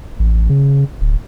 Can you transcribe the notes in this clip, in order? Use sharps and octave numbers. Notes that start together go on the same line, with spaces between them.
A1
C#3
D1